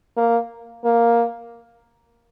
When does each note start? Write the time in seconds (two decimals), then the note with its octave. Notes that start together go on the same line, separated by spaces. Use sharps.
0.17 A#3
0.85 A#3